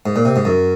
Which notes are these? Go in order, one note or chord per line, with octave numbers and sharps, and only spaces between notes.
G#2
A#2
C3
G#2
F#2